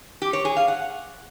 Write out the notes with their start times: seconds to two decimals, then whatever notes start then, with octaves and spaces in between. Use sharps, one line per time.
0.22 G4
0.33 C#5
0.45 G#4
0.57 F5
0.68 F#5